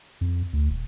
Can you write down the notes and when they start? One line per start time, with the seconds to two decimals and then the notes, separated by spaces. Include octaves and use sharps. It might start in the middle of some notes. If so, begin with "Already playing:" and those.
0.21 F2
0.53 D2
0.70 D#1